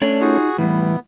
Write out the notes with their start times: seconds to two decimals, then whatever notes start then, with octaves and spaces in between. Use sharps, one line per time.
0.02 A3 C#4 D4 C#5 D5
0.21 D#4 F4 F#4 G#4
0.58 A2 E3 G3 B3